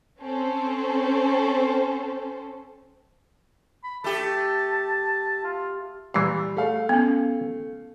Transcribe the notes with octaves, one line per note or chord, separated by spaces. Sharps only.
C4 C#4 A4 C5
B5
A3 G4 A5
F4
A#2 E3 G3 C7
A3 F5
B3 C#4